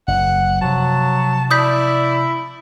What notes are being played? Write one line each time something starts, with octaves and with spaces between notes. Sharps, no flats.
F#1 F#5
C3 F3 F#3 A5
E4 D5 D#6 G6 B6